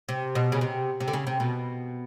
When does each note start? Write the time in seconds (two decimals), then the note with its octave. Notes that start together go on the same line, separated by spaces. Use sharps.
0.09 C3
0.35 B2
0.52 C#3
0.61 C3
1.00 C3
1.08 D3
1.13 C#3
1.27 C3
1.40 B2